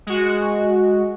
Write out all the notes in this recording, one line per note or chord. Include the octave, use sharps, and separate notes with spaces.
G#3 F#4